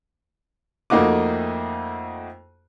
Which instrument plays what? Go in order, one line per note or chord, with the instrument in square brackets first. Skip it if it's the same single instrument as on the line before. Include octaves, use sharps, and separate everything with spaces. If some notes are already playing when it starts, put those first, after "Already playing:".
[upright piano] F2 A3 A#3 D#4 F#4 D6